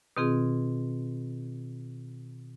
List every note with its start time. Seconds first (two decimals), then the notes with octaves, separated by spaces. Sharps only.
0.17 B2 D#3 C4 F4 G#4